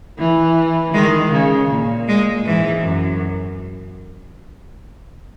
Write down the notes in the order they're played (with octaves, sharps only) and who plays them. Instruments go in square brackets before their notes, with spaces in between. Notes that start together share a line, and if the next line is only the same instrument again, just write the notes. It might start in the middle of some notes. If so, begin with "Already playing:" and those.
[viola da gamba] E3
[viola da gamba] D#3 [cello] G#3
[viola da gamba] C#3
A#2
[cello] G#3
[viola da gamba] G#2 [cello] E3
[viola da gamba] F#2